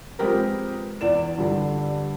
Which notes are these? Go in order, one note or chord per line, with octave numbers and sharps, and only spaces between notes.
F3 G#3 C4 G4 A#4 B4
E2 D5 E7
G2 D3 G3